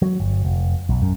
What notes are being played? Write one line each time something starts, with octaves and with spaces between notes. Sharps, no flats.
F#3
G1
F1
B1
F#2